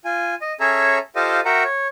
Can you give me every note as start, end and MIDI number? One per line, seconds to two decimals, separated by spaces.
0.05 0.35 65
0.05 0.35 80
0.42 0.53 75
0.60 0.98 61
0.60 0.98 68
0.60 0.98 69
0.60 0.98 73
0.60 0.98 76
0.60 0.98 82
1.16 1.40 65
1.16 1.40 67
1.16 1.40 69
1.16 1.40 72
1.16 1.40 75
1.16 1.40 77
1.45 1.63 66
1.45 1.63 70
1.45 1.63 76
1.45 1.63 78
1.45 1.63 79
1.45 1.63 82
1.64 1.87 73